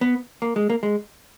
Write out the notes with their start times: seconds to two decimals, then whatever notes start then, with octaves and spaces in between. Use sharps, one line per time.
0.01 B3
0.42 A#3
0.56 G#3
0.70 A#3
0.83 G#3